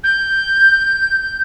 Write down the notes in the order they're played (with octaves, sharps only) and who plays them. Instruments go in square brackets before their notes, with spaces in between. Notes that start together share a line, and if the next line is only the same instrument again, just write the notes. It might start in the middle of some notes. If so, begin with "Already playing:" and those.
[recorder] G6